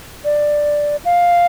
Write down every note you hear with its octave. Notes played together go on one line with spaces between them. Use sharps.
D5
F5